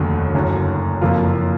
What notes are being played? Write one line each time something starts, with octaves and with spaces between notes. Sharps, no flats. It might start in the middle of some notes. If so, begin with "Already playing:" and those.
Already playing: F1 D#2 D3 F#3
F#1 F#2 D3
F#1 F2 F3 A#3 F4